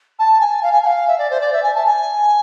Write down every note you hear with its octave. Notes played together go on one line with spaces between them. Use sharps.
A5
G#5
F5
G#5
G#5
F5
E5
D5
C5
D5
E5
G#5
A5
G#5